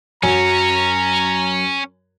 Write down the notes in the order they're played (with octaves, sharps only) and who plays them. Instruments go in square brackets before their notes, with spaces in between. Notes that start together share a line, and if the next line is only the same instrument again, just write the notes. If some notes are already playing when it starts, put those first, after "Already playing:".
[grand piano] F#2 F#3 G#5 [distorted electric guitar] C#4 [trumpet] A#5